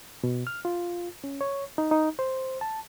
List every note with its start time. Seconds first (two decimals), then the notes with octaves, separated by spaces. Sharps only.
0.24 B2
0.47 F6
0.65 F4
1.24 C#4
1.41 C#5
1.78 D#4
1.91 D#4
2.19 C5
2.61 A5